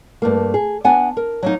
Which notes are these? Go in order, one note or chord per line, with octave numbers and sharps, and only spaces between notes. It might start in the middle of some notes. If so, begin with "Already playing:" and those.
G2 A3 A#3
G#4
B3 D4 F#5 G#5
A#4
F#3 A#3 D#4